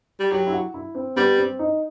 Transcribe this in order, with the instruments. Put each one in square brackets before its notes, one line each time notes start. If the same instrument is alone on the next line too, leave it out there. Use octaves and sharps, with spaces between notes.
[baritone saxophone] G3
[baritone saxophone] F#3 [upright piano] G4
[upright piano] E4
F#4
E4
C4
[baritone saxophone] G3 [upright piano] B3
[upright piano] C4
D#4